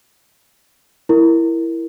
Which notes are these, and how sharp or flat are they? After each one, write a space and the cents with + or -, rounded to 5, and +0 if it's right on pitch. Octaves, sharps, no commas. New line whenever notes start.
E4 +10 A#4 +0